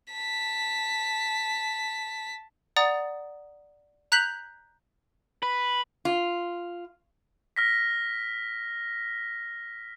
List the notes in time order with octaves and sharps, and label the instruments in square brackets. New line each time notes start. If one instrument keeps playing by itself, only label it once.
[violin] A5 B6
[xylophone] D5 F#5 A#5 D#6 A6
A#5 F#6 G6 B6 F7 F#7
[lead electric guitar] B4
[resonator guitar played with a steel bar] F4
[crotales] F6 A#6 B6